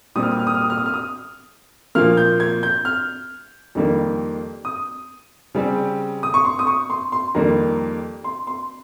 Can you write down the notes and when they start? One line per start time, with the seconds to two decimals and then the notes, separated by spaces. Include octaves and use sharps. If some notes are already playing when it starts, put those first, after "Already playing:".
0.15 A#2 G3 C4 D#6
0.23 F6
0.31 D#6
0.39 F6
0.47 D#6
0.54 F6
0.62 D#6
0.70 F6
0.78 D#6
0.86 F6
0.94 D#6
1.95 A#2 F3 A#3 F6
2.17 G6
2.40 G#6
2.63 G6
2.85 F6
3.75 F2 D#3 G3 A#3
4.65 D#6
5.54 C#3 G3 C4
6.23 D#6
6.34 C#6
6.45 C6
6.59 D#6
6.67 C#6
6.90 C6
7.12 C6
7.35 F2 D#3 G3 A#3 A#5
8.24 C6
8.47 C6